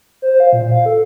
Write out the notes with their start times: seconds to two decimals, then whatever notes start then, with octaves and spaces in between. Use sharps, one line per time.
0.22 C5
0.40 F5
0.53 A#2
0.71 F5
0.86 A4